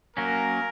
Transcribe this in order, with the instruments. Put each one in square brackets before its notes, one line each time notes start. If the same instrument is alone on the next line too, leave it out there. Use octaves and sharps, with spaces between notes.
[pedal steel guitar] F#3 A#3 C#4 [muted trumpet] A#4